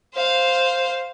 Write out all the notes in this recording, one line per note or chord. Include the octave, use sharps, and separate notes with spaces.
C5 F5